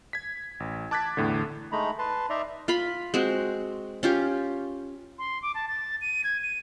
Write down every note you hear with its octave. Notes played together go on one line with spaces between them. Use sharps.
G#6 B6
A1
A5 D6 F#6 G#6 A6 B6
E2 A2 D3
G#3 A3 D#4 A#5 B5
B4 A5 C6
D#4 D5 E5 A#5 C6
F4 F5 B5
G#3 C4 F#4
C#4 F4 G4
C6
D6
A5
A6
D#7
G#6
D#7